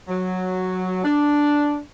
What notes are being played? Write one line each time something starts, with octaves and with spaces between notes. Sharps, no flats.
F#3
D4